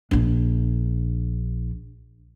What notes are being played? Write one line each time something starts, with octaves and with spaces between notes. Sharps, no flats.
A#1 D4